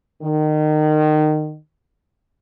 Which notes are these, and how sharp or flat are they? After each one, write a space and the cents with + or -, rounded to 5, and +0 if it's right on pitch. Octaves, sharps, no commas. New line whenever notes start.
D#3 -25